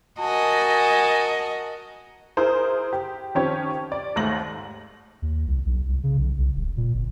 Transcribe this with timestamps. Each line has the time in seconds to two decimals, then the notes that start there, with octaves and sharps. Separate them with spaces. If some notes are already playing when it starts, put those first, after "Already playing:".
0.20 F#4 A#4 D#5 G#5 A5
2.37 E4 G#4 A#4 C5
2.93 G4
3.35 D#3 F3 C4 C#4 G4 C#5
3.92 D5
4.16 D#2 G#2 A3 A#6 F#7
5.22 D#2
5.47 C2
5.66 B1
5.88 C2
6.03 C#3
6.17 B1
6.38 C2
6.56 D1
6.77 A#2
6.95 G1